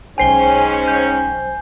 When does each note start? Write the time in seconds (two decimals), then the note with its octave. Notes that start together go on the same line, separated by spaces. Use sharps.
0.18 B1 G#2 C#4 C5 G5 G#5 C7 G7
0.88 G6